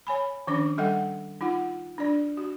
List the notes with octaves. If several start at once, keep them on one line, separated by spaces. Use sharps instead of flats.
C#5 G#5 B5
D#3 F3 C#4 D4 D6
G3 A4 D#5 E5 F#5 G5
D#4 F4 F#5
D4 D5
F#4